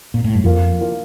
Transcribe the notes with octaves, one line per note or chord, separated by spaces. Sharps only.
A#2
A2
G2
F2 F3 A#3 F4
F3 A#3 F4